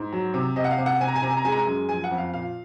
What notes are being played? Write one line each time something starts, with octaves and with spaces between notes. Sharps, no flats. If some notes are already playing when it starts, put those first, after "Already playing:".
Already playing: G#2
F#3
C3
C3 D#5
F#5
F5
C3
F#5
C3 G#5
A#5
G#5
C3 A#5
G#5
A#5
G#3 G#5
A#5
G#5
F#2
F3 G#5
F#5
F2
F5
A#2 F5